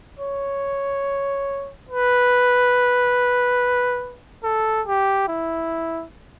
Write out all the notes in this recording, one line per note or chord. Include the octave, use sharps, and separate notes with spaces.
C#5
B4
A4
G4
E4